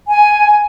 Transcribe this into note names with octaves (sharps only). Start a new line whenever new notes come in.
G#5